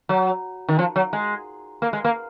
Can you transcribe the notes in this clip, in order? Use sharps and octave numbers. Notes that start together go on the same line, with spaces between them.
F#3
D#3
F3
F#3
G#3
A#3
G#3
A#3